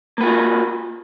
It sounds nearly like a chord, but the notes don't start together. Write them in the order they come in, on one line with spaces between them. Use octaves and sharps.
A#3 B4 F4 F#4